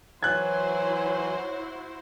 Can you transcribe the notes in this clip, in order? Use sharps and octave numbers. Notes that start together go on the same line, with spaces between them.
E3 F#3 E4 F#4 C5 C#5 F#6 G#6